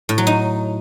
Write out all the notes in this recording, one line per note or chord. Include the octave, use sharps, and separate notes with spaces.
A2
F#3
D#4